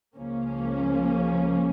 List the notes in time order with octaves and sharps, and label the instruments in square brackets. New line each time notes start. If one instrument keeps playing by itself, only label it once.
[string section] C#2 C#3 F3 A#3 C#4